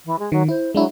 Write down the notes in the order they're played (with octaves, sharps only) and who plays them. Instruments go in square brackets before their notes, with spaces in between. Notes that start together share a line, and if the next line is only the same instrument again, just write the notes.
[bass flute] E3
G#3
[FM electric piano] D#3 [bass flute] F#3
[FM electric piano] E4 [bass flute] C5
[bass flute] F#3 [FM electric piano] G#3 D4 E4